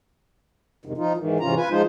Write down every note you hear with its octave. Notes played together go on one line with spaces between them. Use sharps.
F2 G#2 C3 D#3
F3 D#4 F4
G#2 D#3 E3
G#2 C3 E3 C#4 F4 A#5
F4 B4 G#5
F3 G#3 D#4 F4 C5